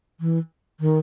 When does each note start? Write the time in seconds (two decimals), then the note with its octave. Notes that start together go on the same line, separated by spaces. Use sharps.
0.20 E3
0.80 D#3